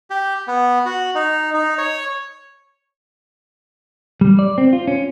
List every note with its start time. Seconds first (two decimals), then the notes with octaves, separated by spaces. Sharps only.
0.10 G4
0.47 B3
0.85 F#4
1.15 D#4
1.54 D#4
1.78 C#5
4.21 G3
4.39 D5
4.58 C4
4.73 F4
4.88 C#4